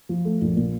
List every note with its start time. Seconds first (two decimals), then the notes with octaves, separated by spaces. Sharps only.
0.09 F3
0.25 A3
0.41 A#1
0.56 A#2